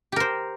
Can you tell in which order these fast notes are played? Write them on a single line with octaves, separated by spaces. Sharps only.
G4 A#4 C5